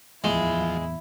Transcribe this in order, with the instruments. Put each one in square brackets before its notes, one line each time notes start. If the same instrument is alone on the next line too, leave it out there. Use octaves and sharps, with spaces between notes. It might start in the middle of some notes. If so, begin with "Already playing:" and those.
[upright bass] D1 E2 [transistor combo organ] F3 [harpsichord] G#3 [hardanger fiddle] E4